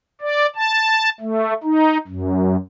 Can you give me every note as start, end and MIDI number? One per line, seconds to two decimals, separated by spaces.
0.21 0.47 74
0.55 1.09 81
1.21 1.54 57
1.63 1.97 63
2.08 2.56 42